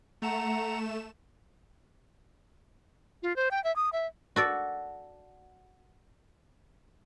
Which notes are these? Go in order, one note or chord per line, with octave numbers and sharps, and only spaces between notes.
A3 F#5 A#5 E7
F4
C5
G5
E5
D#6
E5
F#4 A4 D5